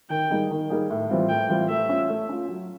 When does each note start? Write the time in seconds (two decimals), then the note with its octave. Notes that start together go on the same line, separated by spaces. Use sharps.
0.10 D#3 G5
0.31 G3 A#3 D#4 G#4
0.51 D#3
0.70 G3 A#3 D#4 G#4
0.90 A2
1.10 E3 G3 C4 F4
1.29 A2 G5
1.49 E3 G3 C4 F4
1.69 A3 E5
1.89 C#4 F4
2.09 A3
2.29 C#4 F4
2.49 F#3